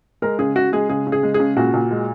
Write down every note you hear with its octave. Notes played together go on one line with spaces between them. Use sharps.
G#3 A#4
C#3 G#4
C#3 F#4
G#3 G#4
C#3 G#4
C#3
G#4
G#3
G#4
C#3
A#2 F#4
A#2
G#3